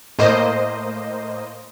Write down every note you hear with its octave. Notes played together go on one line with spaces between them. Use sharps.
A2 A#3 C5 D#5